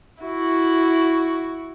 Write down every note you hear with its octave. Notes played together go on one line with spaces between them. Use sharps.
E4 F#4